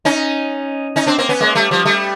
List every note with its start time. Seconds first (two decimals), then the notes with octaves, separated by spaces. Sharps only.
0.05 C#4 D#4
0.96 C#4 D#4
1.07 C4 D4
1.18 A#3 C4
1.29 B3 C#4
1.40 G#3 A#3
1.55 G3 A3
1.71 F3 G3
1.85 G3 A3